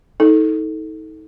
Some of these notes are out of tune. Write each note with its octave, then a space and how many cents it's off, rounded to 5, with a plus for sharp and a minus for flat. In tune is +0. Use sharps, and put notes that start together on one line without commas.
D#4 +30 A4 +0 D#5 -45